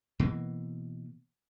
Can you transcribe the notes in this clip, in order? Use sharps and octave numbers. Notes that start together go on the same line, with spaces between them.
B2 E3 A#3